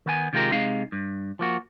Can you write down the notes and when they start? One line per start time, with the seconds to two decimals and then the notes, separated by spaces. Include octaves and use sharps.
0.06 D#3 B3 G#5
0.33 C3 D#3 G#3 F4 G4 A#4
0.52 C3 G#3 D#4 F5
0.92 G2
1.39 F3 A#3 F#4